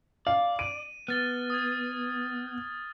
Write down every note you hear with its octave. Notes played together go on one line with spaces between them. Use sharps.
D5 F5
D7 D#7
B3 F6 A6 G7
D#6 G#6